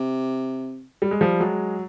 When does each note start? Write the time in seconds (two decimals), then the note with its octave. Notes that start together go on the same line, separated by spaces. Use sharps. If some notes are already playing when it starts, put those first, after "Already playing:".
Already playing: C3
1.02 G3
1.11 G#3
1.21 F3 G3
1.40 F#3 G#3